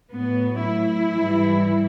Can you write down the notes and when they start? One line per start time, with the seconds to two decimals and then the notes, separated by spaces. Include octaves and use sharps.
0.10 A2 F#3 B3
0.59 E4
1.08 G#2 E3 G3